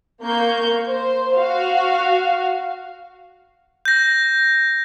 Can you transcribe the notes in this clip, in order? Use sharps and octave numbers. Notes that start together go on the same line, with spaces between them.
A#3 C#6 G6
C5
F#4 F5
G6 A#6